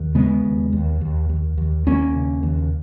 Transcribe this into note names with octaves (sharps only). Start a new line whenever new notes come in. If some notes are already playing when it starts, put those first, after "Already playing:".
Already playing: D#2
C#3 G#3 B3
D#2
D#2
D#2
D#2
D#2
D#2 A#3 C#4
C#3
D#2